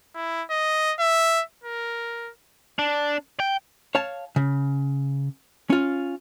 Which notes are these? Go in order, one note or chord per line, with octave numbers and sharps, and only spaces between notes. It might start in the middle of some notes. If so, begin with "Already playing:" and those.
E4
D#5
E5
A#4
D4
G5
C#5 F5 A5
C#3
C#4 F4